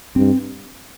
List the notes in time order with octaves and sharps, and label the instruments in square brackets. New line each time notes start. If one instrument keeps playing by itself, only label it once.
[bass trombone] G2 [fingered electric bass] C4